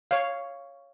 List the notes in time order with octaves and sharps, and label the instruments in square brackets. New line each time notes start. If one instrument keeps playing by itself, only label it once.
[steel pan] C#5 F5